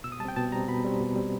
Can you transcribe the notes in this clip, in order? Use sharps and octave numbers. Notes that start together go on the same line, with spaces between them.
B2 E6
D#6
G3 C4 G5 A5
B2 A5
G3 C4 A#5
B2 B5
G3 C4
B2
G3 C4